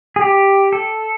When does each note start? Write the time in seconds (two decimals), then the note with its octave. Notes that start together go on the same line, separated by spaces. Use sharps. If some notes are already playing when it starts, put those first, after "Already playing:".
0.16 G#4
0.21 G4
0.73 A4